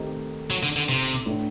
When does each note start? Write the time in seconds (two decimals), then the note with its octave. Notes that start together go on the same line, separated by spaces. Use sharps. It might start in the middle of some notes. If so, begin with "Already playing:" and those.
Already playing: D#3 A3 C4 D#4 G4
0.50 F#3
0.63 D3
0.76 D3
0.89 C3
1.26 A2 A3 D4